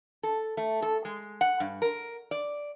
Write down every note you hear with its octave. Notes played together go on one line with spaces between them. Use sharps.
A4
A3
A4
G#3
F#5
G2
A#4
D5